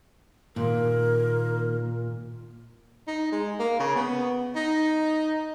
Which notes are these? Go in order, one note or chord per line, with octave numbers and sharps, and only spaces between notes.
D#2 A#2 A#4
D#4
G#3
A#3
C#3
B3
D#4